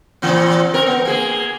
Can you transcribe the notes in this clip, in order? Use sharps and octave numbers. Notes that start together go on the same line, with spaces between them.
A#2 E3 C4
C4 A#4
B3
A#3 G#4